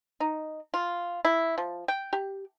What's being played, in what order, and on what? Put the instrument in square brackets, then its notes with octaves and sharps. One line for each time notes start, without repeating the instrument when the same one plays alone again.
[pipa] D#4
F4
E4
F3
G5
G4